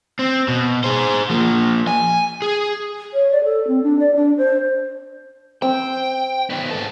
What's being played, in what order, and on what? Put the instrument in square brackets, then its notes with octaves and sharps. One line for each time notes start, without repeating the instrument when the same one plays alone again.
[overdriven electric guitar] C4
B2
G#4 C5
F3 A#3
G#5
G#4
[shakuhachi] C#5
D5
A4
C4
D4
D5
D4
C5
[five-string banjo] C4 [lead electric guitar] G5
[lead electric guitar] D#3 B3
G#2 A4